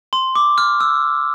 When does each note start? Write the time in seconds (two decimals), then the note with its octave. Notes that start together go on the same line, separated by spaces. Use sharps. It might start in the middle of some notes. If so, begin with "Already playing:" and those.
0.13 C6
0.36 D6
0.58 F6
0.80 E6